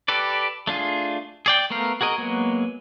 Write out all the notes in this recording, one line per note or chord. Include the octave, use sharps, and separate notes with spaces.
G4 A4 B4 D5
A3 D4 F4 G#4
G#4 D5 G5
A3 B3 A#4 F5
F#4 G#4 A#4 D#5
F#3 G#3 A#3 B3